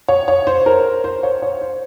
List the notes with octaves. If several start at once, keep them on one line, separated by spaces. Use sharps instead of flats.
C#5
C#5
C5
A#4
C5
C#5
C#5
C5